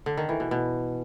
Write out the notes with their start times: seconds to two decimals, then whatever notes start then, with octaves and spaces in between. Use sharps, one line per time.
0.06 D3
0.17 D#3
0.29 E3
0.40 B2
0.51 B2